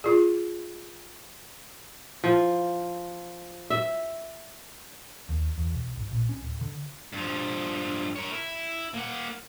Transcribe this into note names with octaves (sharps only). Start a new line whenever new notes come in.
F4 G#4
F3
E5
D#2
E2
B1
G#1
A#1
C#4
D1
D3
G2 F3
A#4 C#5
E4
A#3 F#5